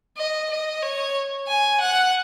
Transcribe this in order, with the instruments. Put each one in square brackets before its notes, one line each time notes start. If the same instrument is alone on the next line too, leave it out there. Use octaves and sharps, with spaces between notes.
[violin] D#5
D#5
C#5
G#5
F#5